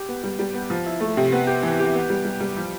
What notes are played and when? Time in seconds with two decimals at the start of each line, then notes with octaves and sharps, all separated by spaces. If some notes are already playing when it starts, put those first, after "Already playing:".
Already playing: G4
0.08 B3
0.23 G3
0.39 G3
0.54 B3
0.70 F3
0.86 E4
1.00 A3
1.17 C3
1.32 B3
1.47 G4
1.63 E3
1.79 G4
1.94 B3
2.09 G3
2.25 G3
2.40 G3
2.56 F3